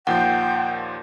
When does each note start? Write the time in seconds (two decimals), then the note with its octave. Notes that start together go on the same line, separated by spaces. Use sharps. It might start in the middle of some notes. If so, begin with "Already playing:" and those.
0.07 D#2 A#2 F3 F#5 G5